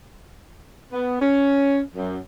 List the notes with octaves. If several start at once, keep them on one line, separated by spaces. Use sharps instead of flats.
B3
C#4
F#2